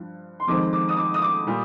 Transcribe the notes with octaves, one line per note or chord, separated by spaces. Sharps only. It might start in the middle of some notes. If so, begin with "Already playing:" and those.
Already playing: G2 F3
C6
F2 D#3 G#3 C4 D6
D6
D#6
D6
D#6
D6
A#2 G3